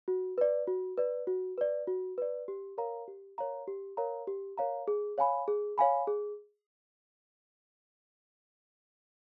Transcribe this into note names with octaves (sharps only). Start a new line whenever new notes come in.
F#4
B4 D5
F#4
B4 D5
F#4
B4 D5
F#4
B4 D5
G4
A#4 C#5 F5 A#5
G4
A#4 C#5 F5 A#5
G4
A#4 C#5 F5 A#5
G4
A#4 C#5 F5 A#5
G#4
C#5 F5 G#5 B5
G#4
C#5 F5 G#5 B5
G#4